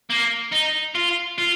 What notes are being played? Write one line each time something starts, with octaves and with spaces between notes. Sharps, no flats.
A#3
D#4
F4
F4